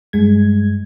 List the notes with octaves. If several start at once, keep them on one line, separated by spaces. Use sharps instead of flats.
G2 G#3 G#6